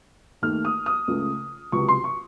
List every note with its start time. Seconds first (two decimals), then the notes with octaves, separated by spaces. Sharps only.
0.42 D#2 D#3 A3 F6
0.65 D#6
0.86 D#6
1.08 C#2 C#3 A3
1.72 C#2 C3 F#3 C#6
1.88 C6
2.04 C#6